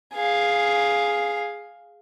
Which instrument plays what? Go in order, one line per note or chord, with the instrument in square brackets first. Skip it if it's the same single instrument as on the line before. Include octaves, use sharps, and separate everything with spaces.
[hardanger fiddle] G#4 F5